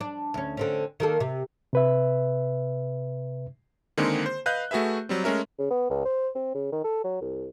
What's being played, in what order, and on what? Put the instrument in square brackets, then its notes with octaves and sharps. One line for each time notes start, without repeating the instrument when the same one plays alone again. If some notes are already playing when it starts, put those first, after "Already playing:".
[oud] D4
D2 C#4
D3 C4 C#4
D#3 A#3 A4
C3
[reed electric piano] C3 B4 E5
[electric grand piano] D3 D#3 G#3 A#3 C4 G#4
C5
B4 D#5 F5 F#6 G6
A3 F#4 G#4 B4 E5
F#3 G3 C4
G#3 A3 C#4 A#4 E5
[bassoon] C#3
B3
C#2
C5
C4
C#3
D#3
A4
F#3
C2